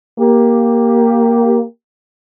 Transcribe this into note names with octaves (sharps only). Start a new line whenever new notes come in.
A#3 G4